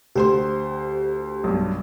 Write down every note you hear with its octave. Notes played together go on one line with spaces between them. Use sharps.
D2 G4 C5 C6
B1 G2